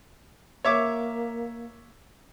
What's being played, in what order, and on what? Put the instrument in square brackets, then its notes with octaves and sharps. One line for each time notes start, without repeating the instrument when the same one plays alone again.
[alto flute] A#3 [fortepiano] C#5 E5 D6